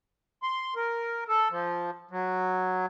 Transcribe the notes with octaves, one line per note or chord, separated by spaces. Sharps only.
C6
A#4
A4
F3
F#3